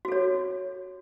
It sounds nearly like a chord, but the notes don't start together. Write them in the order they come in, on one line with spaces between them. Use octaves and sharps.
F#4 A4 C#5